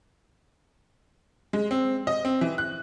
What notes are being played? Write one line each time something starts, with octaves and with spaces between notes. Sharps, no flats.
G#3
C4
D#5
C4
E3
F#6